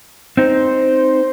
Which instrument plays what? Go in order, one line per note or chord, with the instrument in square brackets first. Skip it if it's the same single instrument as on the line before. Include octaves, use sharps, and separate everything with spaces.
[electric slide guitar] C4 D#4 [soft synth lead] C5